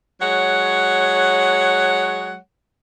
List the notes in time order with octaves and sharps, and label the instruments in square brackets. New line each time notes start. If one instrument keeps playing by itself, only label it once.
[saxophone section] F#3 G#3 C#5 F#5